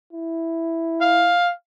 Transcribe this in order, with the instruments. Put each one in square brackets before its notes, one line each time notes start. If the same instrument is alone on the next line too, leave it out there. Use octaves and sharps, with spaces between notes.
[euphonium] E4
[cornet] F5